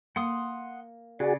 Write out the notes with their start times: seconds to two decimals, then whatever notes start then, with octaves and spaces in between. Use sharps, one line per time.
0.16 A#3 F#5 C6 D#6
1.20 C#3 F#4 G#4 D5